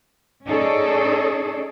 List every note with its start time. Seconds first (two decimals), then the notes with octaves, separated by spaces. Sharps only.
0.47 C#4 D#4 G#4 A4 C#5 D5